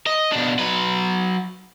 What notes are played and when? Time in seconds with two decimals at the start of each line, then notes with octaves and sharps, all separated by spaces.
0.07 D#5
0.32 B2 D4
0.59 F#3 B4